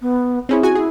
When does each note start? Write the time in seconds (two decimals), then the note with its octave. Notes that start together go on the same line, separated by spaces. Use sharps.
0.01 B3
0.49 C4 C#4 E4 G#4
0.63 F#4 G#5
0.75 E4 G#4